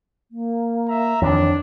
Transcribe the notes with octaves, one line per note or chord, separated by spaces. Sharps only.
A#3
E5 A#5
F2 D#3 E3 D4 C#5